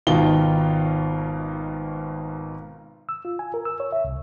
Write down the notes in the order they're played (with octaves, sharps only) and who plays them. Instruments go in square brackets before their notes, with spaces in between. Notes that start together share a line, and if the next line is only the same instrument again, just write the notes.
[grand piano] G#1 B2 D#3 F4 G7
[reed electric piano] E6
F4
G#5
A#4
E6
C#5
E5
C2